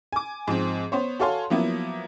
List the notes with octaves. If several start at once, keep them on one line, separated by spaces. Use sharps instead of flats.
G#5 D6
G#2 F3 C4
B3 C5 C#5
F#4 A4 C#5 F5 G#5 C6
F3 F#3 A#3 B3 E4